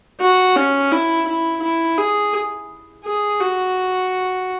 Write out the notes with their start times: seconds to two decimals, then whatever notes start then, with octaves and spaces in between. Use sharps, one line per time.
0.21 F#4
0.56 C#4
0.92 E4
1.27 E4
1.63 E4
1.98 G#4
3.05 G#4
3.40 F#4